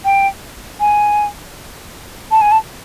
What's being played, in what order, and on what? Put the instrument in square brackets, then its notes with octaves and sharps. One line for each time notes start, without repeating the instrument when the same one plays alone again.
[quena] G5
G#5
A5
G#5
A5